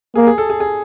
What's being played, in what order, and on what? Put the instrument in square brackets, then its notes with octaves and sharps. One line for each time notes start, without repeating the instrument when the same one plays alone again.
[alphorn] A#3 [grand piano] G#4
[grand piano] G#4
A4
G#4
G#4